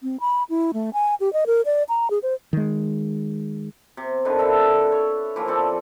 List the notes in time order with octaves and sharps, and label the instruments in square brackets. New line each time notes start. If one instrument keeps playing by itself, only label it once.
[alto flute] C4
B5
E4
A3
G#5
G4
D#5
A#4
D5
A#5
G#4
C5
[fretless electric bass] D#3 G#3
[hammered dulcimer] C3
D3 D#3 F4 B4
A4 B4 E5
C#5
E3 F3 A#3
F3 C4 A4 D5